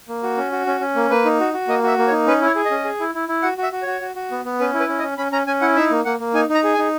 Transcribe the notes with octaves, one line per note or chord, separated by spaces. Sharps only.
A#3
F#4
C#4
F#4
C#4
C#4
A#3
A#3 B4
D#4
F#4
F#4
A#3 D#5
F#4 E5
A#3
C#5
D#4
C#4 B4
E4 C#5
G#4
D#5
C#4
G#4
E4
E4
E4
F#4 F#5
F#4
E5
F#4
F#4 C#5
F#4
F#4
B3
B3
C#4 B4
E4
B4
C#4
D#5
C#4
C#4 B5
C#4 A#5
C#4 G#5
E4 F#5
D#4 E5
A#3
A#3 F#5
A#3
D#4 G#5
D#4
A#5
G#4
G#5
D#4